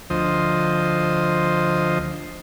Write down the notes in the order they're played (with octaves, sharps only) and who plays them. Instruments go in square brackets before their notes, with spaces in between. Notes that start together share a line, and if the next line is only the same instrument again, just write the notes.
[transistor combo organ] D2 F3 C5 D#5